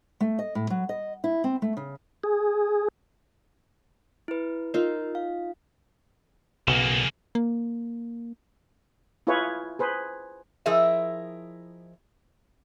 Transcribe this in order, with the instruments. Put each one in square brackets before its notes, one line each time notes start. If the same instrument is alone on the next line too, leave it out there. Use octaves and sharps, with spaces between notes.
[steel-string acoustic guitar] A3
D#5
A2
F#3
D#5
E4
C4
A3
C#3
[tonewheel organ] G#4
[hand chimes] E4 B4
[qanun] D#4 F4 [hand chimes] A#4
[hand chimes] F5
[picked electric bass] B1 [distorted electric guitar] C#3 A#3
[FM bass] A#3
[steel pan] E4 F4 G#4 B4 C#5
G#4 B4 C5
[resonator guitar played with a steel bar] F3 E4 G#4 A#4 D#5 E5